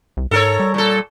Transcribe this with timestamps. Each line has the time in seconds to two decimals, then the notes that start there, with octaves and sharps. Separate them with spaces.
0.17 C2
0.31 G#2 A4 A#4 C#5
0.60 G3
0.74 A#2 A4